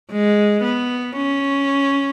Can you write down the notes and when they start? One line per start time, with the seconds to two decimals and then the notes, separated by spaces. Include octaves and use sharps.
0.12 G#3
0.63 B3
1.16 C#4